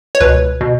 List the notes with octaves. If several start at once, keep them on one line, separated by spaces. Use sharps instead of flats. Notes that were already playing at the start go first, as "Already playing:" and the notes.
C#5
C#2 B2 B4
B2